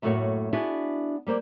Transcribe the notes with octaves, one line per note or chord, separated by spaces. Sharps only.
F#2 A2 A3 A#3 F#4 C#5
B3 D4 E4 F#4 G#4
G3 A#3 C5 D5